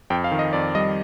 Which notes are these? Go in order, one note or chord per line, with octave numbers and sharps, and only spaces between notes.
F2 G5
F5
D#3
D#5
F2 D5
G3 D#5